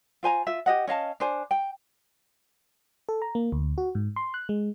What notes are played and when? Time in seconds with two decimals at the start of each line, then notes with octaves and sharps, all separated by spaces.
0.23 F4 C5 G#5 A#5
0.46 F4 E5
0.66 G4 D#5 F#5
0.87 C#4 D#5 F5 A5
1.20 D4 C5 G#5
1.51 G5
3.09 A4
3.22 A#5
3.35 A#3
3.52 D2
3.78 F#4
3.95 G#2
4.16 C6
4.34 F#6
4.49 G#3